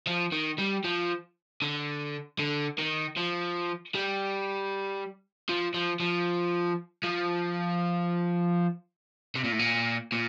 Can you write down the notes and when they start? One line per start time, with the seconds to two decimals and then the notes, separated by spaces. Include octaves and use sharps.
0.07 F3
0.32 D#3
0.59 G3
0.84 F3
1.62 D3
2.39 D3
2.78 D#3
3.17 F3
3.95 G3
5.49 F3
5.74 F3
6.00 F3
7.03 F3
9.36 C3
9.44 A#2
9.52 A2
9.59 A#2
10.12 A#2